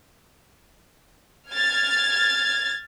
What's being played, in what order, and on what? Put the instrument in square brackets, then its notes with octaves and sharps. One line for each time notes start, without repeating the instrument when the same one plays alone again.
[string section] F6 G#6 A6